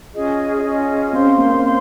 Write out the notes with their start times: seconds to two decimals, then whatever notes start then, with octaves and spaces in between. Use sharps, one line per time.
0.14 C#4 F4 G#4 D#5
0.63 C#4 F4 G#4 D#5
1.13 C#4 C5 F5 C6
1.25 C4
1.38 A#3
1.50 C4
1.62 C5 F5 C6